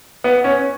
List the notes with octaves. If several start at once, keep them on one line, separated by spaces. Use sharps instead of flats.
B3
C#4